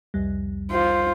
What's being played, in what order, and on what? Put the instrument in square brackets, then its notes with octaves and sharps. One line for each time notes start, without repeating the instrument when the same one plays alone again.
[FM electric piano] C2 F2 G3
[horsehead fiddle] F4 C5